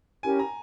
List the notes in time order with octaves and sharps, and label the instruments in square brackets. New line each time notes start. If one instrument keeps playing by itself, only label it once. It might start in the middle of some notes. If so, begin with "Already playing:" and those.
[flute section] C#4 E4 G4 A#4 [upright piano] G#5
[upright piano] A#5